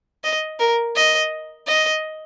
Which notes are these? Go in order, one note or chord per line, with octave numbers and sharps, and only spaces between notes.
D#5
A#4
D#5
D#5